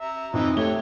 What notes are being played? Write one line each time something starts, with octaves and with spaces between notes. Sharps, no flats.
E5 A#5
F2 D#3 E3 D#4
A3 G4 C#5 G7